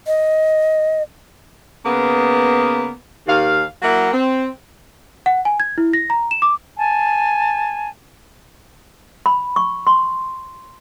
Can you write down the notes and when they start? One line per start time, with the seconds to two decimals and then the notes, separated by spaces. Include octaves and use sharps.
0.07 D#5
1.85 C#3 A#3 B3
3.27 D#2 F5
3.82 F#3 A#3 E4 A#4 F#5
4.13 C4
5.26 F#5
5.45 G#5
5.60 G#6
5.78 E4
5.93 A#6
6.10 A#5
6.31 E7
6.42 D6
6.77 G#5 A5
9.26 B5
9.56 C#6
9.87 C6